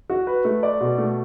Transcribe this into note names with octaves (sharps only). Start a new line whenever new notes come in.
F#4
B4
A3
D5
B2
A3